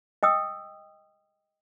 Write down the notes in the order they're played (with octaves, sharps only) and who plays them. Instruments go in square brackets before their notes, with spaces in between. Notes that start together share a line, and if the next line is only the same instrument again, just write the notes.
[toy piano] D#5 G5 D#6 E6